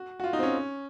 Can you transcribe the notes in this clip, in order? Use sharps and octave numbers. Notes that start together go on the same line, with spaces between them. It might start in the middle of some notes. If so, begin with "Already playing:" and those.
Already playing: F#4
F#4
F4
D#4
C4
C#4